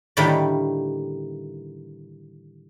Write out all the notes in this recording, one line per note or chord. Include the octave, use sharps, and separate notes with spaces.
A2 D3 D#3 G3 A3 A#3